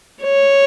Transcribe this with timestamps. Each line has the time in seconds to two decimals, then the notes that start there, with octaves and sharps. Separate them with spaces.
0.22 C#5